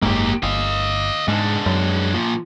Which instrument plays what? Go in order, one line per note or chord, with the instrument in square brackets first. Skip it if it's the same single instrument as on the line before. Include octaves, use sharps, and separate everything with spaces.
[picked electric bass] F#1 G#2 [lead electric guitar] A#3 G4
[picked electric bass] G1 [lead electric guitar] D#5 F5
[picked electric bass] G#2 [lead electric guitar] G#3 D4
[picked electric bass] F#2
[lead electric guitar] A#2 F3